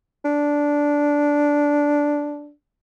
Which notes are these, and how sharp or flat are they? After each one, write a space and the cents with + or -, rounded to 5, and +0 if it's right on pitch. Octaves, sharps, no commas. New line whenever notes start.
D4 -10